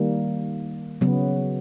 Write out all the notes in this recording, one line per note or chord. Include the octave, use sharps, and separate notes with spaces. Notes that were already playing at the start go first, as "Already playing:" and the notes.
Already playing: D#3 G3 A#3
C#3 F#3 B3